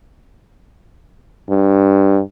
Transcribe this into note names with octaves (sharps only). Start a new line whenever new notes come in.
G2